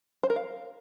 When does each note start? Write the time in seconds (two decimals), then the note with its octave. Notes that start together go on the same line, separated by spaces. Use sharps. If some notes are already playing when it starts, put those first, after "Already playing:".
0.23 C5
0.30 A#4
0.36 F5